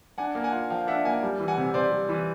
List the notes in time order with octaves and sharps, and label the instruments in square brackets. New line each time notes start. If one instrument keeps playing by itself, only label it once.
[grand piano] D4 F#5 G#5
A#3
F#5 G#5
F4
F3 F5 G5
D4 E5 F#5
A#3 F#5 G#5
G3
E3
F#5 G#5
C3
C3 C5 D5
G3
E3